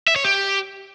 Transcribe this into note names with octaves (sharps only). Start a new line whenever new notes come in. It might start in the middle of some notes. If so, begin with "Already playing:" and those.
E5
C#5
G4